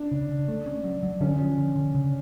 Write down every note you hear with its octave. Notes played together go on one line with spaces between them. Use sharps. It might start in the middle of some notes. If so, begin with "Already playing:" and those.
Already playing: D4
C#3
C#3
A3
C#4
F#3
F#3
D3 C#4
F3
D3
D3
C#3